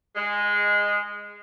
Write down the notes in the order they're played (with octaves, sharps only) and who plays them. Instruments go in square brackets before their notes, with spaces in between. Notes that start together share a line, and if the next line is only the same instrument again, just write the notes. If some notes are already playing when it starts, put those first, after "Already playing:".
[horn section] G#3